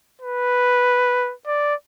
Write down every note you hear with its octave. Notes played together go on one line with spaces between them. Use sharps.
B4
D5